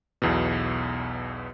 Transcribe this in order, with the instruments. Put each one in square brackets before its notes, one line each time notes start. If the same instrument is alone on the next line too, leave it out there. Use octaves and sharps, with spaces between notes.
[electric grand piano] B1 E2 B2